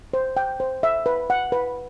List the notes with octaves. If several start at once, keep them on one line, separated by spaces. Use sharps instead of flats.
C5
G5
C5
E5
B4
F#5
B4